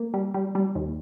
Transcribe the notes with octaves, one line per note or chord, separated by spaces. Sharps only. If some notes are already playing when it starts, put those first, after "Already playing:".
Already playing: A#3
G3
G3
G3
D#2